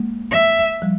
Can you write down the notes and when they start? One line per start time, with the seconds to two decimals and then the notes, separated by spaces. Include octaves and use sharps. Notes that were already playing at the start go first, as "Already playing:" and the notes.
Already playing: G#3 A#3
0.31 E5
0.82 F3 G3